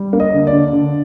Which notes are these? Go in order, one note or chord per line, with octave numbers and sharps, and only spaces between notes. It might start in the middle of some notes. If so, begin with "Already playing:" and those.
Already playing: G3
A#3
D#5
D3
D5
D3
D3